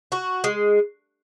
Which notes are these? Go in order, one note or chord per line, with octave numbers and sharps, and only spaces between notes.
F#4
G#3